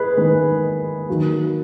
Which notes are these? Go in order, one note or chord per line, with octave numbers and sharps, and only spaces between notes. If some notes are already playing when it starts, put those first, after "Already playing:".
Already playing: G#4 B4
D#3 G#3 B3
D#3 F#3 A#3